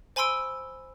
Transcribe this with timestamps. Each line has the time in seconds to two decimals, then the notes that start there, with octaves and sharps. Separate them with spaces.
0.16 C5 G#5 B5 C6 E6 D7